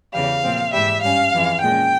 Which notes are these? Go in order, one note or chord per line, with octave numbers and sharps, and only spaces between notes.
E2 C#3 E3 G3 F5
A#2 F3 C4
G#2 E3 G3 E5
G2 G3 C#4 F5
F2 E3 G#3
A#2 G#3 C#4 G5